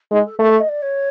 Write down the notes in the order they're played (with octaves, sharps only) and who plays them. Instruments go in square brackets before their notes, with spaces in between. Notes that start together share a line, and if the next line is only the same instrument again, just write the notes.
[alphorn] G#3 [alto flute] D#4
[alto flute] A4
[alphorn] A3 [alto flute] A#4
[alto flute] E5
D#5
D5
C#5